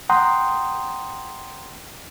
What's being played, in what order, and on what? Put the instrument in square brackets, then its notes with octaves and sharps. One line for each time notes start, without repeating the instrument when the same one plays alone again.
[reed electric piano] F#5 G5 A#5 C6 D#6